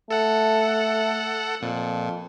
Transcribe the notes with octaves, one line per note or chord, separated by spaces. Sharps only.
A3 A4 F#5
F2 A#2